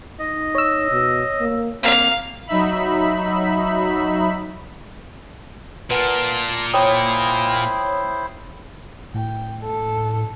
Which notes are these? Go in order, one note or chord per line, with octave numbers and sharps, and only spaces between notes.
D#4 D#5
C#5 E6
B2
A#3
A#3 C4 F5
F#3 D#4 E5 B5
A#2 A#3 B4 F#5 A5 C6
E4 C5 C#5 G5 D#6
A2 G5
A4